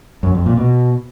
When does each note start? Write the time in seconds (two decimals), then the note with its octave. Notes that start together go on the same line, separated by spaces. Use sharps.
0.23 F#2
0.34 F2
0.46 A#2
0.57 B2